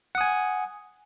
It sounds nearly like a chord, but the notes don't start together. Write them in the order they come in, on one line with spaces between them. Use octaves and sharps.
F#5 D#6 G#5